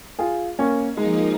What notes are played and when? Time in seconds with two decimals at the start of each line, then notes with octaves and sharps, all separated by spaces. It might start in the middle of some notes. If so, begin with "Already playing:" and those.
0.19 F4 G#4
0.59 A#3 C#4
0.97 F3 G#3 A#3 D#4